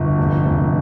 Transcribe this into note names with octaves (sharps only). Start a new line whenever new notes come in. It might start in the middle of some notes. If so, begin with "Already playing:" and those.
Already playing: G1
F1
F1